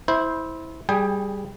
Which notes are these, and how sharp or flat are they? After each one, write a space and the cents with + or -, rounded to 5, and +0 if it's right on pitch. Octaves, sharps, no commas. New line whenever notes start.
E4 -20 C5 +0
G3 +0 G#4 +0 G5 +25